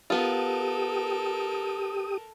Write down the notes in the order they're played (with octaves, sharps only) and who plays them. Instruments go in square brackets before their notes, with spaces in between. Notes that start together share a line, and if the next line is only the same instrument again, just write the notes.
[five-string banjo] B3 F4 [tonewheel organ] G4 D#6 [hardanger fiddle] A4 A#4